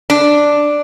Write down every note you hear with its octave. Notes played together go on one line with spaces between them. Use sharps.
D4